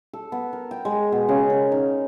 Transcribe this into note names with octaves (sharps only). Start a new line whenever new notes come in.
A4
B3
A#4
G5
G#3
B2
C#3
A#4
D#4